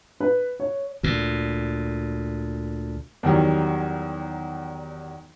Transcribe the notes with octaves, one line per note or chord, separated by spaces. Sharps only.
B4
C#5
D2 A#2
E2 D#3 F#3 G3